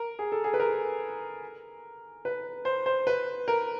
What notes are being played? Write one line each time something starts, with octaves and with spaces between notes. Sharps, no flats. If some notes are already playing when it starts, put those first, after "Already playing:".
Already playing: A#4
G#4
A4
G#4
B4
A#4
B4
C5
C5
B4
A#4